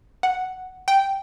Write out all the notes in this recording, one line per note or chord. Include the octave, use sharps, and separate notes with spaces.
F#5
G5